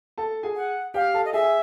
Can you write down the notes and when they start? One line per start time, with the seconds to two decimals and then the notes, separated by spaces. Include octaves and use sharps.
0.18 A4 A5
0.43 G#4 G#5
0.56 F#5
0.94 G4 F5 G5
1.14 A4 A5
1.25 D#5
1.33 G#4 E5 G#5
1.43 G#5